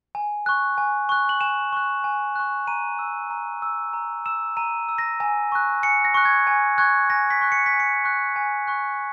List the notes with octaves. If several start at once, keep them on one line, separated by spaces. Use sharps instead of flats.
G#5
C#6 F#6
G#5
C#6 F#6
F#7
G#5 E7
C#6 F#6
G#5
C#6 F#6
A#5 D#7
E6
A#5
E6
A#5
E6 E7
A#5 D#7
E6
A#6
G#5
C#6 F#6
G#5 C#7
A#6
C#6 F#6
G#6
G#5
C#6 F#6 G#6
G#5 A#6
B6
C#6 F#6
C#7
B6
G#5
C#7
C#6 F#6
G#5
C#6 F#6